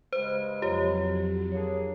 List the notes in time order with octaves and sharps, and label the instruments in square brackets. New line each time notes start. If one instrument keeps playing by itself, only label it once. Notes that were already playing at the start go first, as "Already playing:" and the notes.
[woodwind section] G2 C#3 G#3 [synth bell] C5
[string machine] F2 F#3 [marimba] F4 C#5 A#5 [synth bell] G4
[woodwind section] A#3 D4 G#4 [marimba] C#5